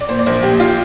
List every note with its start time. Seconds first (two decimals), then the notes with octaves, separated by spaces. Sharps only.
0.01 D5
0.09 A#2 C5
0.19 D5
0.26 A#1 C5
0.43 A#2 G4
0.60 F4